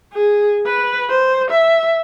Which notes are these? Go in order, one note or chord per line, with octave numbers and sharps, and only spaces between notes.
G#4
B4
C5
E5